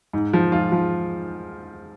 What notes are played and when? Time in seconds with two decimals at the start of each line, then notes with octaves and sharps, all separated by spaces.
0.13 G#2
0.33 F3
0.52 G#2 F4
0.72 F3